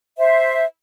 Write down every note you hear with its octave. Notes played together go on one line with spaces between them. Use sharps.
C5 E5